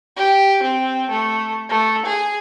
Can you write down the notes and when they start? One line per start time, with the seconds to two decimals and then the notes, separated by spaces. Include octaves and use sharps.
0.17 G4
0.63 C4
1.10 A3
1.70 A3
2.06 G#4